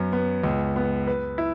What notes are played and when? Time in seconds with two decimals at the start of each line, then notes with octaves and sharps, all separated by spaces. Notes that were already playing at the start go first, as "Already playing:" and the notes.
Already playing: F#2 B3
0.13 B3
0.44 C#2
0.76 B3
1.07 B4
1.38 E4